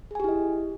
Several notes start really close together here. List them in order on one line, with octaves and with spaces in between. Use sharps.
G#4 G#5 G4 E4 D#5